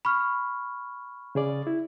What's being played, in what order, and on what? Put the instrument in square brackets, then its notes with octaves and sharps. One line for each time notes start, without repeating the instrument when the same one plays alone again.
[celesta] B5 C#6 F6
[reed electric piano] C#3 G#4 D5
E4